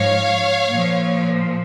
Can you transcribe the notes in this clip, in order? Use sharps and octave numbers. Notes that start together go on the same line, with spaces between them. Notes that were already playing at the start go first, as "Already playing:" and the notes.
Already playing: G#2 F3 C#5 F5
A#2 F3